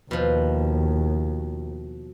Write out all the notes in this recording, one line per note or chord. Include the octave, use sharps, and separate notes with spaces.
D#2 B2 F3